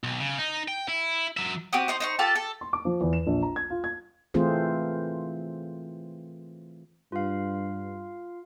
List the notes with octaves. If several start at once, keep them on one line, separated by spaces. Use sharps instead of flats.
B1
C#3
D#4
G5
E4
F#3 E5
C4 F#4 G4 D#6
D#4 C5 D#5
D#4 C5 C#6
F4 G4 A4 A5
A4
C6
D6
F3
E2
E7
A#1
A#5
G#6
F4
G#6
E3 A3 C4 F4 G#4 C5
G2 F4 F5